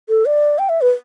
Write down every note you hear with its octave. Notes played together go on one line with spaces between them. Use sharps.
A4
D5
G5
E5
B4